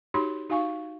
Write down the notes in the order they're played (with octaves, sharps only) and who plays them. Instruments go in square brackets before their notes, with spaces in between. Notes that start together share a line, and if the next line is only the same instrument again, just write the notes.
[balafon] D#4 F#4 G4 C#5 B5 C6
D#4 F#4 F5 G#5 C#6